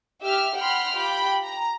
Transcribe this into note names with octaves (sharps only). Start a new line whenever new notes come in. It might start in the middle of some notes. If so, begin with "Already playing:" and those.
G4 E5 F6
F#5 G5 B5 C6 F6
F4 G4 G5 B5
A#5